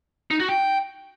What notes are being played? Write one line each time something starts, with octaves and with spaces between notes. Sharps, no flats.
D#4
F#4
G5